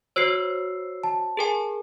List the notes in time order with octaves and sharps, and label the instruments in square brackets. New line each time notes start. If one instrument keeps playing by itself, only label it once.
[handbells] F#4 C5 C#5 [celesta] E6 C7
[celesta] A5
[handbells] G#4 A#4 G#5